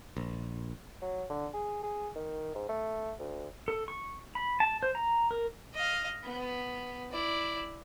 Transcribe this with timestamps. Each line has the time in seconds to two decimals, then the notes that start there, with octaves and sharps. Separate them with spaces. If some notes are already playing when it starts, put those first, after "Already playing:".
0.17 A#1
1.02 F#3
1.30 D3
1.54 G#4
1.83 G#4
2.16 D#3
2.55 G#2
2.69 A3
3.19 D2
3.68 A4
3.88 C#6
4.35 B5
4.60 A5
4.83 C5
4.95 A#5
5.31 A#4
5.74 D#5 F5
6.24 B3
7.12 E4 D5